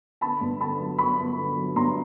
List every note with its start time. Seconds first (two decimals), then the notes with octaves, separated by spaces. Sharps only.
0.21 D3 A5 B5
0.41 G2
0.61 D3 A5 B5
0.79 F#3
0.98 G1 B5 C#6
1.18 G1
1.38 D3
1.56 F#3
1.76 G2 A#5 C6